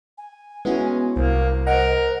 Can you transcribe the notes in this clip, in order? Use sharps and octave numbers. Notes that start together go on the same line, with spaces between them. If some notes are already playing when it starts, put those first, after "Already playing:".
G#5
G#3 B3 C#4 E4 F#4
C2 A#3 C5
A#4 D#5 F#5 A#5